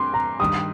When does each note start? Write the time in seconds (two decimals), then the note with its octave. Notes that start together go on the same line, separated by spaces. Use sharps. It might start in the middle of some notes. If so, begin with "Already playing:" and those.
Already playing: G2 A3 C4 C6 D6
0.14 A#5
0.40 G2 D#3 G3 D#6